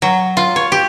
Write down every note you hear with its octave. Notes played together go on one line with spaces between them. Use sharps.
F#3
F4
C#5
G4